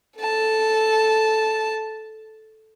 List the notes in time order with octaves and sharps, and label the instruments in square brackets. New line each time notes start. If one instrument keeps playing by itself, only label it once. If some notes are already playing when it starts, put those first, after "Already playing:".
[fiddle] A4 A5